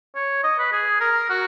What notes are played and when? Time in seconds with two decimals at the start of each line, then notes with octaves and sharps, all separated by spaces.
0.15 C#5
0.44 D#5
0.59 B4
0.72 G#4
1.01 A#4
1.30 F#4